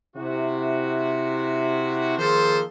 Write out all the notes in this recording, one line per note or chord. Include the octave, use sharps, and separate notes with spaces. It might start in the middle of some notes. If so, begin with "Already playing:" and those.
C3 E4 F#4
D#3 F3 A#3 G#4 A4 C5